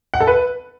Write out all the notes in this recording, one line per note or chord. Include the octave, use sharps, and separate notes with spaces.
F#5
A4
B4